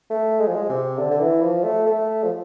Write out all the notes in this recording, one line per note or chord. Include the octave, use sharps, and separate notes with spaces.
A3
G#3
F3
G#3
C3
D3
D3
E3
F3
A3
A3
F3